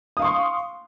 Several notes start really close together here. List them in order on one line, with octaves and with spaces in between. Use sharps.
D#6 F5 C#6 C6